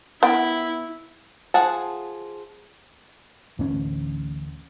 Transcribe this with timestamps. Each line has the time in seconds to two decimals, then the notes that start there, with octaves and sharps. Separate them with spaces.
0.23 B3 E4 G5
1.54 F3 G#4 F#5 A5
3.59 D1 A1 C#4